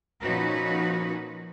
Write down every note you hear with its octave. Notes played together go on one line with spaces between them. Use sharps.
A#2 F3 C#4 D#4 F#4 B4